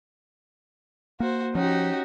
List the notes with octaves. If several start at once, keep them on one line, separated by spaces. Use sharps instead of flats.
A#3 F#4 C5
F3 C#4 D#4 F#4 G4